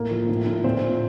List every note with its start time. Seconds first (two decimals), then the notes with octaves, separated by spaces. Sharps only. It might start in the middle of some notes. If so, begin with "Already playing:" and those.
Already playing: A2 A#3
0.11 F3
0.29 A2
0.47 A2
0.64 A#2 C4
0.83 A#2